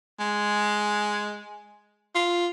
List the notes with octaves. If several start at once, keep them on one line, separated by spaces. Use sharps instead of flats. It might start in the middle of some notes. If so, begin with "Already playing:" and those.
G#3
F4